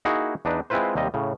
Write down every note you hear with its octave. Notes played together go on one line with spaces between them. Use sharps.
A#3 D#4 E4 F#4 G#4
E2 D4 D#4 B4
G#3 C4 E4 F4 B4 C5
D#2 C3 G3 D#5
A2 C#3